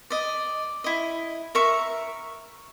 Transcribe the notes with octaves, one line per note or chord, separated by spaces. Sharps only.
D5 D#5
E4 D#5
A#4 E5 C#6